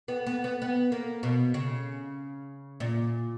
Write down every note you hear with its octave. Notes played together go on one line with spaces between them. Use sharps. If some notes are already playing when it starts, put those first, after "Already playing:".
B3
B3
B3
B3
A#3
B2
C#3
A#2